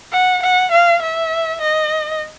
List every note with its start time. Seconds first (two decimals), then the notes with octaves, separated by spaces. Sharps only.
0.12 F#5
0.43 F#5
0.72 F5
1.02 E5
1.61 D#5